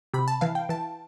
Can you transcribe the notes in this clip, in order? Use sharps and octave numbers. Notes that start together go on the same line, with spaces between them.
C3 B5
A5
E3 F5
G5
E3 A5